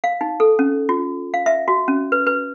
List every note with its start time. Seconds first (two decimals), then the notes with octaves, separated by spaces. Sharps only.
0.04 F5
0.21 D#4
0.40 A4
0.59 C#4
0.89 F4
1.34 F5
1.46 E5
1.68 F#4
1.88 C#4
2.12 B4
2.27 B4